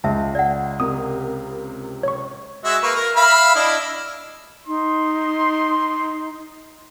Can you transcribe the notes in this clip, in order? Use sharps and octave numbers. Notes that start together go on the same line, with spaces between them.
C#2 E5 A5
D5 F#5
C3 A#4 D#6
C#5 C#6
G#3 F#4 E5
A#3 B4 C#6
A#4
E5 F5 B5
D4 E4 D#5
D#4 C6